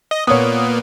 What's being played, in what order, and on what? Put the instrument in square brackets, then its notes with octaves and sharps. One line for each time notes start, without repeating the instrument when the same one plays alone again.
[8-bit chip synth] D#5
[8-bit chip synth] A#2 A#3 B3 [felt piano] C#5 D#6